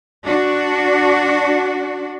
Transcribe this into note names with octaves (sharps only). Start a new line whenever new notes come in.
D4 F#4